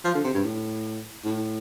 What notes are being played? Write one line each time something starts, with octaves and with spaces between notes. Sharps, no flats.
F3
D3
C3
G2
A2
A2